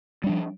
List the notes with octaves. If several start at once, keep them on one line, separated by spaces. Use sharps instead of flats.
F3 G3 D4